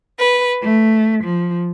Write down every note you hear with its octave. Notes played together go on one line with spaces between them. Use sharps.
B4
A3
F3